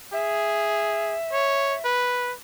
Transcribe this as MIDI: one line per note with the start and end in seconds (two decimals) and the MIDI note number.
0.13 1.16 68
0.13 1.83 76
1.33 1.75 73
1.85 2.33 71